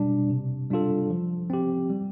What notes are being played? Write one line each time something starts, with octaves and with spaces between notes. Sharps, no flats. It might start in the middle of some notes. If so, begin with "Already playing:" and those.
Already playing: B2 G3 D4
C3
G3 D4 F4 A4
F3
C4 G4
G3